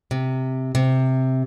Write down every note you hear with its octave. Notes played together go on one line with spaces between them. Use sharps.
C3
C3